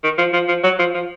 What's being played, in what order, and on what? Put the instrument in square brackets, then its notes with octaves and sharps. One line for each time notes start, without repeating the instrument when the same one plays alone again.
[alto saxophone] D#3
F3
F3
F3
F#3
F3
F3